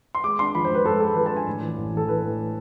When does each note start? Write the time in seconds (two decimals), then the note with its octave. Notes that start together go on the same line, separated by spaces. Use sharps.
0.15 C6
0.24 G#3 D6
0.39 D4 C6
0.55 F3 B5
0.65 C5
0.70 G#2 B4
0.85 G#2 A4
1.00 G#3 A4
1.16 F3 B4
1.26 A5
1.31 D4
1.36 G#5
1.47 A2
1.61 E3
1.77 A1
1.93 E3 A4
2.08 E3 B4
2.23 A2